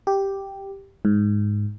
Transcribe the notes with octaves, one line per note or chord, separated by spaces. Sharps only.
G4
G#2